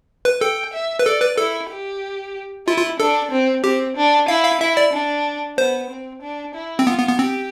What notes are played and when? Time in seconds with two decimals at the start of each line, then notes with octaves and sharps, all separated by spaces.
0.25 B4
0.41 A4 G5
0.73 E5
0.99 B4
1.05 A4 D5
1.21 B4
1.38 E4 A4
1.70 G4
2.67 E4 F4
2.78 F4
3.00 D4 A4
3.31 C4
3.64 C4 G4
3.97 D4
4.28 E4 F5
4.45 F5
4.61 E4 E5
4.77 D5
4.93 D4
5.57 B3 C5
5.90 C4
6.22 D4
6.55 E4
6.79 C4
6.87 B3 F4
6.98 B3
7.08 B3
7.19 C4 G4